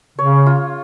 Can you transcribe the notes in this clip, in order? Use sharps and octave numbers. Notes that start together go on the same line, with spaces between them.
C#3 C#5
F4